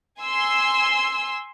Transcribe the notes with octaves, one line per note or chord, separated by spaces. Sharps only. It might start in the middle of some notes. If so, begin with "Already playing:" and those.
G#5 C6 E6